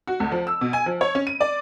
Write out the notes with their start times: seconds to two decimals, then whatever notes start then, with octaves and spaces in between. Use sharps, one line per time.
0.07 F#4
0.20 D2
0.32 F3
0.47 E6
0.61 B2
0.73 G#5
0.86 F3
1.01 C#5
1.15 C#4
1.27 D#7
1.41 D5